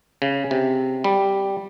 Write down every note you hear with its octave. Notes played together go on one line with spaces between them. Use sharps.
C#3
C3
G3